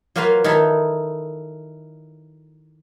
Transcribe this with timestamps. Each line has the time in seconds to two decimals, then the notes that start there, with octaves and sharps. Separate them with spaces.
0.16 F#3 A#3 F4 F#4 B4 F5
0.44 D#3 D#4 E4 A4 B5